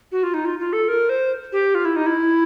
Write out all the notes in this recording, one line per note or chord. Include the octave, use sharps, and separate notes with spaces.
F#4
F4
D#4
F4
F4
A4
A#4
C5
G4
F4
E4
D#4
E4